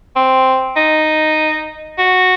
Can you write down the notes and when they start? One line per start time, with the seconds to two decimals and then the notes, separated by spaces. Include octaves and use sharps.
0.16 C4
0.76 D#4
1.98 F#4